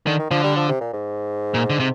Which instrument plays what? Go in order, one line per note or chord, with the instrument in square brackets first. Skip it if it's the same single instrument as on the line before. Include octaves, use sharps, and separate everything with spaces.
[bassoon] D3 [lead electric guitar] D#3
[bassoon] D#3
[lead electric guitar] D3 [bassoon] F3
[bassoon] G3
F3
C3
A#2
G#2
[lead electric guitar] A#2
D3
C3